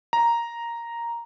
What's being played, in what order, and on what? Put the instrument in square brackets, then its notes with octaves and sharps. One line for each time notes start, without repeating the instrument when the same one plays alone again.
[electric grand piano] A#5